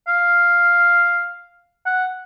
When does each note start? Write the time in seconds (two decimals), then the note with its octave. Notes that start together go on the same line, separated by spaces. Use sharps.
0.08 F5
1.86 F#5